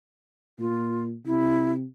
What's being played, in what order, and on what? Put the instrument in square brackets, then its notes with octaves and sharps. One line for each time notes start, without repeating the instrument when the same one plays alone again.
[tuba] A#2 [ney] F4
[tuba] C3 [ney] E4